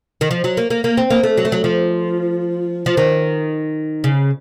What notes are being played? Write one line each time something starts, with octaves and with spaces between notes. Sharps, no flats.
D#3
F3
F#3
A#3
A#3
A#3
C4
A#3
A3
F#3
A3
F#3
F3
F3
D#3
C#3